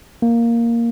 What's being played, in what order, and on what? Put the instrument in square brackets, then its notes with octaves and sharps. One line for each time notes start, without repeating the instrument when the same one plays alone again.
[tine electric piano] A#3